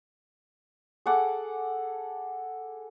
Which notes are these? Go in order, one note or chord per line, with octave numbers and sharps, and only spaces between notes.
G#4 A4 F#5 D6